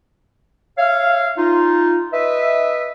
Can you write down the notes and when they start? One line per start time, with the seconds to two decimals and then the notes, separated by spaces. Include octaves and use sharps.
0.78 C#5 E5 F5
1.38 D#4 F4
2.13 B4 D#5 E5